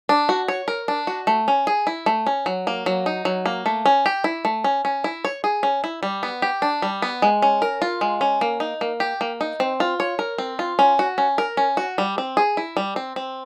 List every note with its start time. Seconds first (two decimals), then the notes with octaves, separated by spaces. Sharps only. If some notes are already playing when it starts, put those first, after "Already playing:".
0.09 D4
0.29 F#4
0.48 C#5
0.68 A#4
0.88 D4
1.07 F#4
1.27 A3
1.48 C#4
1.67 G#4
1.87 E4
2.06 A3
2.27 C#4
2.46 F#3
2.67 A#3
2.86 F#3
3.06 D#4
3.25 F#3
3.46 A#3
3.66 A3
3.86 C#4
4.06 G4
4.24 E4
4.45 A3
4.64 C#4
4.85 C#4
5.04 E4
5.25 C#5
5.44 G#4
5.63 C#4
5.84 E4
6.03 G3
6.23 B3
6.42 G4
6.62 D4
6.82 G3
7.02 B3
7.22 G#3
7.42 C#4
7.62 A#4
7.82 F4
8.01 G#3
8.21 C#4
8.41 A#3
8.60 D#4
8.81 A#3
9.00 G4
9.21 A#3
9.41 D#4
9.60 C4
9.80 F4
10.00 C#5
10.19 A#4
10.38 C4
10.59 F4
10.79 C#4
10.99 F#4
11.18 C#4
11.38 A#4
11.57 C#4
11.77 F#4
11.98 G3
12.18 C4
12.37 G#4
12.57 E4
12.77 G3
12.96 C4
13.16 C4